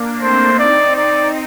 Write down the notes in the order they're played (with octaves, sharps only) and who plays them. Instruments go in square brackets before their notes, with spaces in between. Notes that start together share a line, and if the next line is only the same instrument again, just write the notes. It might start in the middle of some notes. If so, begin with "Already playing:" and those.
Already playing: [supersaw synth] A#3 D4
[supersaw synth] A3 C4 [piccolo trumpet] C5
[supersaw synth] C4 D#4 [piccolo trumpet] D5
[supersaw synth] C4 D#4 [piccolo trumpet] D5